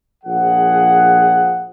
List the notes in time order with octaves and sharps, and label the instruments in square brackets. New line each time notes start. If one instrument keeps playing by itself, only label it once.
[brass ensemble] A#1 F3 G#4 F#5